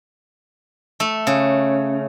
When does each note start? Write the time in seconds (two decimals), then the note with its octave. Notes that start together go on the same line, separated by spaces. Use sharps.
1.00 A3
1.27 C#3